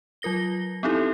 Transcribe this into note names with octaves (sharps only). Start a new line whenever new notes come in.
F#3 F4 A#4 A#6 G7
B3 C4 D#4 E4 G4 A4